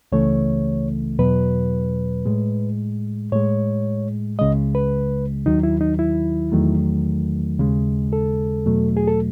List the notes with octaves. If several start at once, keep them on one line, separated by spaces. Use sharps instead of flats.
C#2 C#3 E3 A3 C#5
E2 B2 F#3 B4
A2 G#3
A2 G#3 C#5
C#2 C#3 G#3 D#5
B4
D#2 D#3 F#3 D#4
E4
D#4
E4
E2 D#3 F#3 A3
D#2 C#3 G#3
A4
E2 B2 F#3 A3
G#4
A4